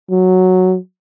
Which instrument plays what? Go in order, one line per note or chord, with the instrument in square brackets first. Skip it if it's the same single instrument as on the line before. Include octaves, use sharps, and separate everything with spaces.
[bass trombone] F#3